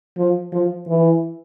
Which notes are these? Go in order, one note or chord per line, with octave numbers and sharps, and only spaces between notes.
F3
F3
E3